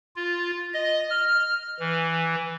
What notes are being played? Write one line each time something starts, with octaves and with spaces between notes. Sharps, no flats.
F4
D#5
F6
E3